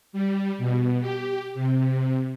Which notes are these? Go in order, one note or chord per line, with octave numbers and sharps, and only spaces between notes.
G3
B2
G4
C3